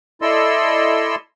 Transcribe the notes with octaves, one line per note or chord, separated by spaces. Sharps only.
E4 A4 D5 D#5 C6 E6